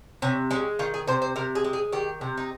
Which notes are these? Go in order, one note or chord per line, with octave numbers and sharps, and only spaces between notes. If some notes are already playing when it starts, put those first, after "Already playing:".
C3 C#4
G#3 C#4
D#3 F4
G#4
C3 C5
C5
C3 A#4
G#4
G#3
G#4
D#3 G4
C3
D#4